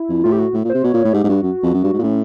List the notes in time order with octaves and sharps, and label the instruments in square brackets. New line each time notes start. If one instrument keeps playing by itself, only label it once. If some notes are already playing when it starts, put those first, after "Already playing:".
Already playing: [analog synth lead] E4
[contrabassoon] F2
[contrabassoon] A2 [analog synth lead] F4
[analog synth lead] G4
F#4
[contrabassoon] A2
A#2
[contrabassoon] C3 [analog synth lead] C5
[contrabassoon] B2 [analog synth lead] C#5
[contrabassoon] A#2
A2
[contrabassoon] G#2 [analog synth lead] G4
[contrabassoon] G#2
[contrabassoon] G2 [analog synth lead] F#4
[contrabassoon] F#2
F2
F#2
G2
G#2
A#2
[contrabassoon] A2 [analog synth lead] C#4